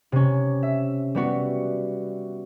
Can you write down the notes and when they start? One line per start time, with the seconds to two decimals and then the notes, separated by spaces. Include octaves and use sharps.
0.12 C3 C#4
0.63 E5
1.15 G3 B3 F#4